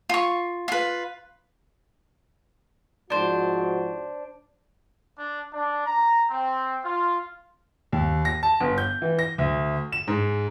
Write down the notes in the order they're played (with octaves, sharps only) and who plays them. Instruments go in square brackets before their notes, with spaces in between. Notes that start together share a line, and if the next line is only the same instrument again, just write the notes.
[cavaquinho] F4 C#6
F4 B4
[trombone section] G#2 F3 F#4 [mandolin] D4 C5
[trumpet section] D4
D4
A#5
C4
F4
[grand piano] D#2
A#6
A5
G1
G6
E3
A#6
D2
E7
G#2